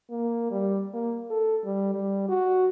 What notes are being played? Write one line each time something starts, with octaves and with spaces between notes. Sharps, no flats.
A#3
G3
A#3
A4
G3
G3
F#4